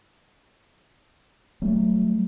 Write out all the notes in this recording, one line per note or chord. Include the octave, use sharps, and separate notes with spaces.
F#3 G3 A3